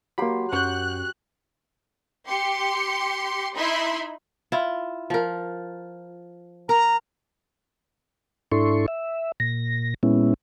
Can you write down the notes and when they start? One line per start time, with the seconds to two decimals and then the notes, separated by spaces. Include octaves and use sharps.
0.18 F#3 A#3 G4 B5 C6
0.53 F#2 C#5 F#5 F#6 G6
2.27 G4 C6 C#7
3.54 D#4 E4 E5 B5 C6
4.52 E4 F4
5.10 F3 A#4
6.69 A#4 A#5
8.52 G#2 D4 E4 A4 C6 C#6
8.88 E5
9.40 A#2 A#6
10.03 A#2 G#3 B3 C#4 E4